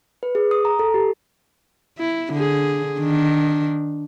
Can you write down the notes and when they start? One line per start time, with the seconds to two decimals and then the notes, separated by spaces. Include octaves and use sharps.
0.23 B4
0.35 G#4
0.51 D#6
0.65 A#5
0.79 A4
0.94 G4
1.98 E4
2.33 D3 G#4
2.99 D#3 D4